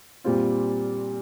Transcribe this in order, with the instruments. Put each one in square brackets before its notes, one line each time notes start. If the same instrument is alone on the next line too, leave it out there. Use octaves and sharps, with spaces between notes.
[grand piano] A#2 G3 C4 F4